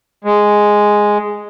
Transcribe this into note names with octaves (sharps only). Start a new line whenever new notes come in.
G#3